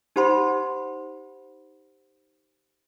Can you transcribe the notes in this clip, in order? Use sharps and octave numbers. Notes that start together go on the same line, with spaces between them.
D#4 G4 C5 F#5 B5 C6